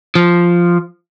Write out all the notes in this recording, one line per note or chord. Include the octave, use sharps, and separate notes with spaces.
F3